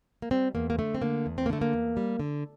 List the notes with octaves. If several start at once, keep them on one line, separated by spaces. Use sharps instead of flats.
A#3
G3 C4
E2 A#3
A#3
D3 A3
C4
D3 A#3
E2
C4
A#3
D3 A3
A#3
E2
G3
D3